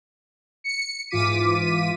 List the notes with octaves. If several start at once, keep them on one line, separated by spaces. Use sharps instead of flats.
C#7
G#2 E3 F4 D6 B6 D#7